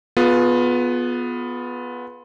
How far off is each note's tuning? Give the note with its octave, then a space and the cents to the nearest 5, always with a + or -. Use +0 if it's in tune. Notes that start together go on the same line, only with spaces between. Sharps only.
B3 +0 F4 +20 G#4 +35